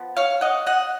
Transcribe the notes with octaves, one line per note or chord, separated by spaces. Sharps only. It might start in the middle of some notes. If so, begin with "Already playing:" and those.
Already playing: F3 B3
C#5 F5
D#5 F#5
D#5 F#5